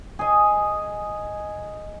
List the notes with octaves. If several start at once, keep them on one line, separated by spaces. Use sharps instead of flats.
G#4 D#5